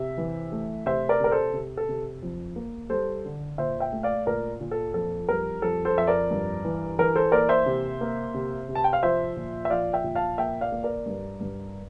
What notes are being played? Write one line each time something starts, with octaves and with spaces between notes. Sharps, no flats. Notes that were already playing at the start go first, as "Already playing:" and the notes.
Already playing: C3 E5
E3
A3
C3 C5 E5
A#4 D5
C3 A#4
A4 C5
C3
A4
C3
F2
A#3
G3 A4 C5
D3
A#2 C5 E5
E5 G5
A3
D5 F5
A#2 A#4 D5
A#2
A4
F2 A4
G3 A#4
F2 A4
A4 C5
F2 E5
A#4 D5
G2
E3
E3 A#4
A4 C5
A#3 A#4 D5
C5 E5
C3
A#3
C3
C3
A5
G5
F5
F3 C5 E5
A#2
E5
F3 D5 F5
E5 G5
A#2
F5 A5
A#3 E5 G5
D5 F5
A#3
A#4 D5
G2
G2